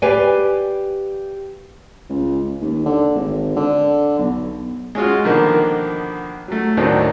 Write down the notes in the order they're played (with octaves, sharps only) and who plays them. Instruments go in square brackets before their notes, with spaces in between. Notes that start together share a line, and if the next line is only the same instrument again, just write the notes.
[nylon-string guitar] G4 B4 D5 F5 G#5
[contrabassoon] C#2
D#2
D3
G#1
D3
B1
[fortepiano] G#3 C#4 F4 F#4
B2 D3 D#3 F3 A#3
F#3 A3
D#2 A2 D#3 F#3 C4 D4